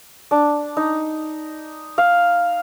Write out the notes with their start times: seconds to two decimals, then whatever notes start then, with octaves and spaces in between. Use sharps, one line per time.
0.31 D4
0.77 D#4
1.98 F5